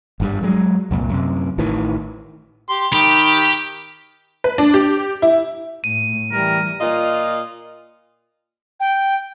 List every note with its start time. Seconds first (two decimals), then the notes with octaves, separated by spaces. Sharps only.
0.20 G#1 G2 G3
0.43 F#3 G#3
0.91 C2 F2 A#2
1.09 F#2 C3
1.58 A1 A2 D#3 E3
2.69 G4 C6
2.93 D#3 G4 G5 B5
4.44 B4
4.58 D4
4.74 G4
5.22 E4
5.84 A2 D#7
6.32 E3 G3 A#4
6.81 A#2 F4 D#5
8.80 G5